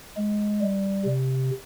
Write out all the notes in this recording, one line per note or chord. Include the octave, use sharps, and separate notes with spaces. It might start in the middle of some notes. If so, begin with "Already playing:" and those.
G#3
G3
C3